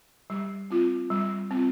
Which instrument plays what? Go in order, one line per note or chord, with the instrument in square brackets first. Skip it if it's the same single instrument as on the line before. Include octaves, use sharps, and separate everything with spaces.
[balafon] G3
C4 F4
G3
C4 F4